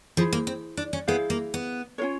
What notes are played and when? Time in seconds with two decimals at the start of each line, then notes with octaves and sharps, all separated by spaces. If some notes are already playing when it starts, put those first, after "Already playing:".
0.17 F3 E4 G#4 C5
0.33 A#3
0.47 C4
0.77 D4
0.93 C#4
1.07 B3 E4 G#4 C5 F5
1.30 A#3
1.54 B3
1.98 C#4 F4 A#4 C#5